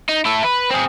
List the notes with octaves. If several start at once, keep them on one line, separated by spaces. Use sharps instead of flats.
D#4
E4 A4
B4
C4 G#4